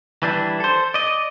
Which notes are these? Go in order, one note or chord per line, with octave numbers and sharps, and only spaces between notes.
E3 G3 D4 E4
A4 C5
D5 D#5